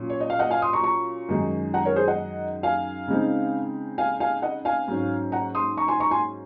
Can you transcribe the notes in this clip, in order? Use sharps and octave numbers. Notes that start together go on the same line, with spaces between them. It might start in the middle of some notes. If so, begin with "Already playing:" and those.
Already playing: A#2 F#3 C#4
C#5
D#5
F5
D#5 F#5
F5 G#5
C6 D#6
A#5 C#6
A#5 C#6
F#2 D#3 G#3 D#4
F#5 A#5
A#4 C#5
G#4 C5
D#5 F#5
F5 G#5
C#3 G#3 C4 D#4
F5 G#5
F5 G#5
D#5 F#5
F5 G#5
G#2 F#3 C#4
F#5 A#5
C6 D#6
A#5 C#6
G#5 C6
A#5 C#6
G#5 C6